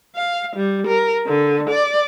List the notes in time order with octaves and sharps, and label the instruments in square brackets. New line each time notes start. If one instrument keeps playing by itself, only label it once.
[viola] F5
G3
A#4
D3
D5